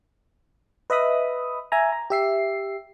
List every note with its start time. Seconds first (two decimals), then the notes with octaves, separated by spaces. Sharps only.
0.90 B4 D#5 E5 B5 D#6
1.72 E5 G#5 A#5
1.92 A#5
2.10 G4 E5 C7